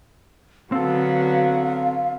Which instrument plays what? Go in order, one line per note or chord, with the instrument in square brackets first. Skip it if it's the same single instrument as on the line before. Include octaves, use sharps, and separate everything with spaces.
[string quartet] D3 F#3 B3 [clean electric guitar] C4 A4 [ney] F5